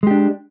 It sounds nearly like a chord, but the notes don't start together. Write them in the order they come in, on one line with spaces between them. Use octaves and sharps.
G#3 G4 D4